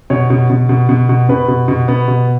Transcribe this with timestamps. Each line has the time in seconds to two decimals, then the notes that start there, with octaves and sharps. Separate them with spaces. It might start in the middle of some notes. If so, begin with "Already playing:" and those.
0.10 B2 C#5
0.30 B2
0.50 B2
0.69 B2
0.89 B2
1.09 B2
1.29 B2 B4
1.48 B2
1.68 B2
1.88 B3
2.08 B2